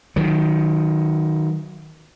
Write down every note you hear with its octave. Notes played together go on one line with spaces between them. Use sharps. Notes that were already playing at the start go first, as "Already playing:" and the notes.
D#3 F#3